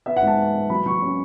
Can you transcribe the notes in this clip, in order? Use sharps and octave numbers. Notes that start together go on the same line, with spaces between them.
B3 E5
F#5
G#2 A5
B3
B3
F#3 B5
F#3 C#6
C#4